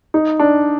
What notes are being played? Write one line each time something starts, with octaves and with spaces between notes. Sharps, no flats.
D#4
D4